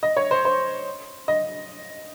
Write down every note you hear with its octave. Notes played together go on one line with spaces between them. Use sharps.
D#5
C#5
C5
C5
D#5